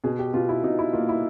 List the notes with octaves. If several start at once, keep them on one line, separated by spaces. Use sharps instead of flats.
B2 G#4
G4
B2 F4
E4
B2 D#4
E4
A#3 F4
E4